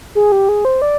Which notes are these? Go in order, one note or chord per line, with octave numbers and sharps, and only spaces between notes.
G#4
G4
G#4
C5
D5